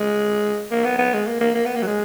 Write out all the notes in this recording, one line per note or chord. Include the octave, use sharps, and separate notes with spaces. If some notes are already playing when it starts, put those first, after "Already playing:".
Already playing: G#3
A#3
B3
B3
G#3
A#3
A#3
A#3
B3
A#3
F#3
G#3